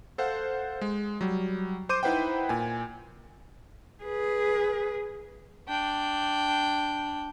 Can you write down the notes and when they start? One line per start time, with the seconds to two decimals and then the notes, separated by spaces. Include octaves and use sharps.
0.18 A4 C5 F5 F#5
0.81 G#3
1.21 F#3 G3
1.89 C5 C6 D6 G6 D#7
2.03 D#4 E4 B4 C5 F#5 G5
2.49 A#2 G#5
4.04 G#4 B4
5.68 D4 G5